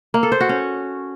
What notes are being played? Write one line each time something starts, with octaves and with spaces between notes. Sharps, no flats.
A#3
A4
C5
F#4
C#4